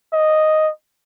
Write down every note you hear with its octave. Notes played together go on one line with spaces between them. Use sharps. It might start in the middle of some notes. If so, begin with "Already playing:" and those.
D#5